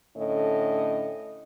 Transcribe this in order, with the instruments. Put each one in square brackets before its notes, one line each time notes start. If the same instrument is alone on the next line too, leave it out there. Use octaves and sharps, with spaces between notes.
[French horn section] A2 D3 C#4 A4 D#5